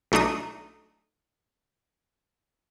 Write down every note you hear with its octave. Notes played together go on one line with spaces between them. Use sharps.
B1 A3 D4 D#4 D#6